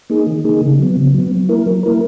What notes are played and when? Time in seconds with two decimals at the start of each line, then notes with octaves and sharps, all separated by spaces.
0.10 A#3 D#4 G#4
0.27 D#3
0.45 A#3 D#4 G#4
0.61 C#3
0.79 F#3 B3
0.97 C#3
1.14 F#3 B3
1.31 F#3
1.49 A#3 E4 A#4
1.66 F#3
1.83 A#3 E4 A#4